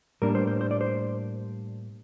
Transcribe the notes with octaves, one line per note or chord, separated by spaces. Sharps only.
A2 G3 A#3 D4 A#4
C5
C5
C5
D5
C5